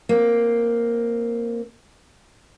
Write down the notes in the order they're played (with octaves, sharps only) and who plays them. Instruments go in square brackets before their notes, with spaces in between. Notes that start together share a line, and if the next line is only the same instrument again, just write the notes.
[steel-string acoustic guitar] A#3 C4